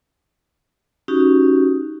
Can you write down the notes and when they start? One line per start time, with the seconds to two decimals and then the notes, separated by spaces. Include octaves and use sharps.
1.08 C#4 D#4 F#4 G4